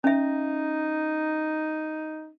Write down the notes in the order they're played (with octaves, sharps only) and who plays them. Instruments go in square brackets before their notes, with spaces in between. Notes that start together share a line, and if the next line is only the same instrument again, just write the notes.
[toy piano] C#4 E5 [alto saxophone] D#4